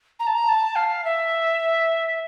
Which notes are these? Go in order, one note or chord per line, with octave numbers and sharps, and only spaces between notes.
A#5
A5
A#5
A5
F5
E5